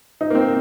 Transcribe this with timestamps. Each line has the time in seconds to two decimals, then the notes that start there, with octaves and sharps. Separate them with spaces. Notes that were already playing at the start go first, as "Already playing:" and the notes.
0.21 D#4
0.30 A#3
0.35 C4